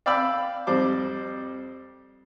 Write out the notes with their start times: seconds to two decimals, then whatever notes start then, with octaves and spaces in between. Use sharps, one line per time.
0.06 D5 F5 G5 B5 E6
0.67 F2 G3 C5 D6